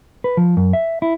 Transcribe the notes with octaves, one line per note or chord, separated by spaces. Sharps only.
B4
F3
F#2
E5
E4